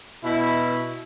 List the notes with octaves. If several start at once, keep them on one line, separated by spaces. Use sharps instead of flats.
B2 E4